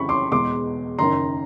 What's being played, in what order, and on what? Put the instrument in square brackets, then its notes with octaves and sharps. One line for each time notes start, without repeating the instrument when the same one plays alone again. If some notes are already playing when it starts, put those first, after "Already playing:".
Already playing: [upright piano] F2 C#3 E3 G3 B5 C#6
C6 D6
E2 B2 G#3 C6 D6
F#1 F#2 D#3 A#5 C6